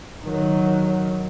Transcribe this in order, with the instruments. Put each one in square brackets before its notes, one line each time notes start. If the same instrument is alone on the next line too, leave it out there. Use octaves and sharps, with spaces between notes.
[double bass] D#3 F#3